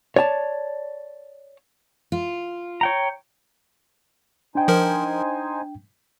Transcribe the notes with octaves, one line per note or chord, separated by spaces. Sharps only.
C#5 D5 G#5 A5
F4
C#5 G5 A#5
D4 D#4 C5 G5 G#5
F3 A#4